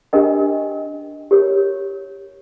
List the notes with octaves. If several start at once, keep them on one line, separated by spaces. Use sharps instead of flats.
D4 G4 A#4 D#5 G5
G4 A#4 C#5